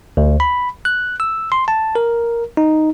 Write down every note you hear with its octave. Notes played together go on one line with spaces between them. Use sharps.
D2
B5
F#6
E6
C6
A5
A#4
D#4